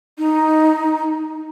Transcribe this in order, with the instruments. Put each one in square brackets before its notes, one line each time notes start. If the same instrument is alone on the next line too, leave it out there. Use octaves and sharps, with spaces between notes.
[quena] D#4